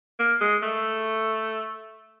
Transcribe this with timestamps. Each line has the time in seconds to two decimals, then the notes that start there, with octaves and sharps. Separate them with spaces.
0.19 A#3
0.41 G#3
0.62 A3